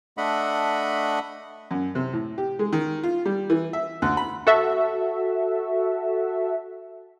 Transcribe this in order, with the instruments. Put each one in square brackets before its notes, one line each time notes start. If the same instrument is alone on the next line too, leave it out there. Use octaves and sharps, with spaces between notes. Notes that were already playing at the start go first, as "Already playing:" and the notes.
[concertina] A3 D4 D#5 E5 F#5 B5
[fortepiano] F#2
C3
A2
G4
G#3
D#3
F4
G3
E3
E5
D2
B5
[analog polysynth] F#4 A4 E5